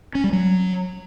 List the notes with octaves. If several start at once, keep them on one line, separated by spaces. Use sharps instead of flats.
C#4
G3
F#3